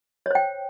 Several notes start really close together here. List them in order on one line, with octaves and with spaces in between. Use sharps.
C#5 C5 G5